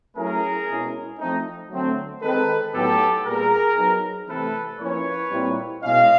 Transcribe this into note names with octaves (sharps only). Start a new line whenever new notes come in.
F#3 A3 C#4 E4 G#4 A#4
B2 G#3 C#4 E4
F3 A3 C4 D#4
D3 F#3 A3 C4
D#3 G#3 C4 D#4 A4 B4
A2 F#3 B3 D#4 G4 A4
A#2 G3 B3 G#4 A#4
F#3 B3 D#4
C3 E3 A3 C4 E4 A4 B4
F3 A#3 C#4 E4 B4 C#5
A#2 G3 C4 E4
B2 G#3 C#4 E4 D#5 F5